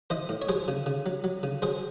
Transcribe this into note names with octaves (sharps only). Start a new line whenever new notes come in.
E3 C5 D#5
A2
C#5
F#3 G#4 C5
C#3
C#3
F#3
F#3
C#3
F#3 G#4 C5